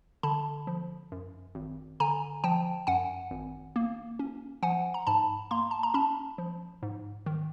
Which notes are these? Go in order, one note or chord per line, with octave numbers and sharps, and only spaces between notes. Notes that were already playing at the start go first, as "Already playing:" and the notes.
D3 A5 B5
F3
F#2
G#1
D3 G#5 A#5
F3 G5 A5
F#2 F#5 G#5
G#1
A#3
C#4
F3 F#5 G#5
A#5
G#2 A5 B5
A#3 A#5 C6
A5
A#5
C#4 A5 B5
F3
G#2
D#3